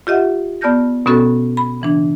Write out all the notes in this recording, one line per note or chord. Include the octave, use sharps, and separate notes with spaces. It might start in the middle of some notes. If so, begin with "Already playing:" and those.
F4 G4 D#5 E5 F#5
B3 D5 A5 F6 G6 A#6
B2 B3 C#4 F#4 A4
B5
C#3 E3 D4